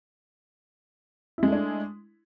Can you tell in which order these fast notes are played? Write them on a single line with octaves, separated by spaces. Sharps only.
E4 G#3 A3 D4